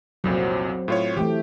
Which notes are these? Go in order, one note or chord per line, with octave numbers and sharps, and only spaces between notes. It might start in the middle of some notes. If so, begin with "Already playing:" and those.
C2 F2 A#2 F#3 C4
A2 F4 C#5
E3 A3 G4 G5